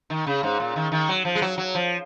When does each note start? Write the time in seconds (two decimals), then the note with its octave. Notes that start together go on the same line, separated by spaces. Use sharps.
0.10 D#3
0.27 C#3
0.43 G#2
0.60 A#2
0.76 D#3
0.92 D#3
1.09 F#3
1.25 F3
1.35 G#3
1.42 F#3
1.58 F#3
1.75 F3